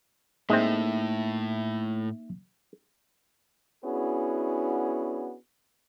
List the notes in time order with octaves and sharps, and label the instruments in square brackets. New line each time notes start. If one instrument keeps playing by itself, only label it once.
[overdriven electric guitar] A2 [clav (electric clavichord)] G#3 C4 [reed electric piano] A#3 D#4 E5
[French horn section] B3 C#4 D4 E4 F#4 G#4